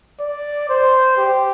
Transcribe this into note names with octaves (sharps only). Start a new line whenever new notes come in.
D5
C5
G4